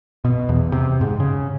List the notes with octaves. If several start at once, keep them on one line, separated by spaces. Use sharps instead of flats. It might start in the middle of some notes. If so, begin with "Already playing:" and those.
B2
E2
C3
G#2
C#3